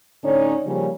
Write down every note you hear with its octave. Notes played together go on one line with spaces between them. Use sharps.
A2 D3 C#4 D#4 C#5 D5
C#3 F3 G3 A#3 C#4